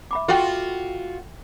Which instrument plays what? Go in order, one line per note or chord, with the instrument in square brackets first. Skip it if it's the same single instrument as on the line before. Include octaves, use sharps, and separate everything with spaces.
[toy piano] E5 B5 D6
[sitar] F4 F#4 [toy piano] A4 G5